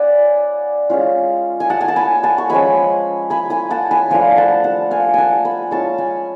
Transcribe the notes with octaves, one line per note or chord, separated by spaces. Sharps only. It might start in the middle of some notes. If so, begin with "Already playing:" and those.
Already playing: C#4 F4 D5 F#5 G#5 B5
G#3 C#4 F4
G#5
F#5 A5
G#5
A5
G#5 B5
F#5 A5
C#6
F3 G#3 C#4 G#5 B5
G#5 B5
G#5 B5
F#5 A5
G#5 B5
F3 A3 D4 F4 F5 G#5
F#5 A5
F#5 A5
F5 G#5
F#5 G#5 A5
G#5 B5
G#3 C#4 F4 A5 C#6
G#5 B5